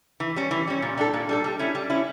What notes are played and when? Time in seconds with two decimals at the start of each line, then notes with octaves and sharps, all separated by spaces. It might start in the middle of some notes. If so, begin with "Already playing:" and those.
0.20 E3
0.36 G3 C#4
0.51 E3
0.67 G3 C#4
0.82 A#2
0.97 G3 D4 A4
1.14 A#2
1.29 G3 D4 A4
1.44 G3
1.59 C#4 E4
1.75 G3
1.90 C#4 E4